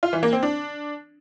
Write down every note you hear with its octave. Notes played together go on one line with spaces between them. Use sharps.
F4
E3
A#3
C4
D4